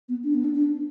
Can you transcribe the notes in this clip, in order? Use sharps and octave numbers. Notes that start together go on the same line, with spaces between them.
B3
D4
B3
D4
D4